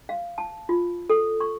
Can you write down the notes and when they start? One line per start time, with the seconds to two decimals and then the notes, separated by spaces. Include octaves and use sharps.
0.09 F5
0.38 A5
0.69 F4
1.10 A4
1.40 C#6